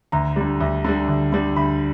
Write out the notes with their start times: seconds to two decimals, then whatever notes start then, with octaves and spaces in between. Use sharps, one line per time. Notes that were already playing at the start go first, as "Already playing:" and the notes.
0.12 D2 A#5
0.36 D3 G3
0.61 D2
0.85 D3 G3
1.09 D2
1.33 D3 G3
1.56 D2 B5